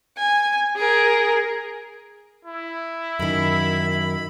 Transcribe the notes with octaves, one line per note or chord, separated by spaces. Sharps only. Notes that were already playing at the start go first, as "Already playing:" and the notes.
G#5
G#4 A#4
E4
F#2 D#3 B5